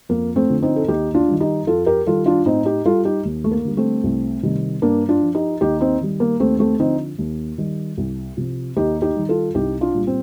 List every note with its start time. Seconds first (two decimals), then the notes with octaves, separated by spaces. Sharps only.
0.09 F2 A#3
0.36 A3 C4
0.49 D3 F3
0.62 C4 D#4
0.76 A4
0.88 D#2 D#4 G4
1.14 D4 F4
1.28 D#3 G3
1.40 D#4 G4
1.67 F2 F4 A4
1.86 G4 A#4
2.06 D#3 G3 F4 A4
2.26 D4 F4
2.46 A2 C4 D#4
2.65 D#4 G4
2.85 G3 F4 A4
3.05 D#4 G4
3.25 D#2
3.44 A3
3.51 A#3
3.64 D3 G3
3.77 A3 C4
4.04 C2
4.43 C3 D#3 G3
4.82 G2 A#3 D4
5.09 D4 F4
5.22 F3
5.35 D#4 G4
5.61 D#2 D#4 G4
5.81 C4 D#4
6.01 D#3 G3
6.20 A#3
6.40 D#2 A3 C4
6.59 A3 C4
6.79 D3 F3 C4 D#4
7.19 D#2
7.58 D#3 G3
7.97 C2
8.37 C3 F3
8.76 D#2 D#4 G4
9.02 D#4 G4
9.16 D#3 G3
9.29 F4 A4
9.54 C2 D#4 G4
9.81 D4 F4
9.94 A#2 G3
10.07 C4